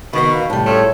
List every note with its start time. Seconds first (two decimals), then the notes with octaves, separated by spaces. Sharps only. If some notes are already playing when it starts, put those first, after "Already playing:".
0.13 B2 D#3 B3 C#6
0.34 F5
0.50 A2 G3 A5
0.65 C#3 F3 A3 C#5